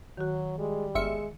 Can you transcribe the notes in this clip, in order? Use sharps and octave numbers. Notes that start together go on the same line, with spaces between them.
D#3 F#3 F#4
G3 G#3
G1 G#3 E5 C6 F6 C#7